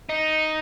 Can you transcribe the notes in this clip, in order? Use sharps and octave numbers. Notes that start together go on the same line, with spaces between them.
D#4